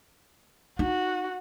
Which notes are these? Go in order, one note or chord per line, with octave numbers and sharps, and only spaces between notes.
D#4 F#4